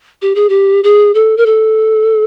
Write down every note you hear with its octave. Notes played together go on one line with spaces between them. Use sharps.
G4
G#4
G4
G#4
A4
A#4
A4